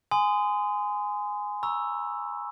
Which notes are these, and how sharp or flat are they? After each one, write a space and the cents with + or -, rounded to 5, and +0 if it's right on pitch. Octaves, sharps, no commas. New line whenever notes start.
G#5 +0 C6 -30 D#6 +0
A#5 +20 C#6 +0 E6 +0